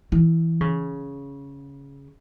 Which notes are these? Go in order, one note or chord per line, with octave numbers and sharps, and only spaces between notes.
E3
C#3